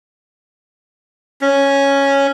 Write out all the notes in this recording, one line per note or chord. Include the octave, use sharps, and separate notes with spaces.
C#4